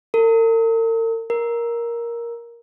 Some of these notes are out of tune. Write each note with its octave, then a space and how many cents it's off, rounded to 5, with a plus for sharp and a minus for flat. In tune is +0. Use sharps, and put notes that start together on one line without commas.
A#4 -45
A#4 +10